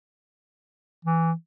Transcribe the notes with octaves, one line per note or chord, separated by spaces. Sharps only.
E3